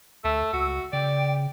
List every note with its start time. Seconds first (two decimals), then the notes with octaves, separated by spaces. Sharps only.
0.24 D2 A3 E6
0.53 C#2 F#4
0.93 C#3 D5 G5